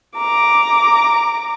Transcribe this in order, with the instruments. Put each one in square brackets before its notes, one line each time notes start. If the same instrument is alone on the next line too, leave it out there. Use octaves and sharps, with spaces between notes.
[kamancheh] A#5 D6